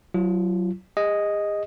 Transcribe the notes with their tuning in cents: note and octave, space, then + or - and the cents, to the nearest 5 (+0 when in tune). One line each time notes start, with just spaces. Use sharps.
F#3 +15 F4 -40
G#4 -40 D#5 +0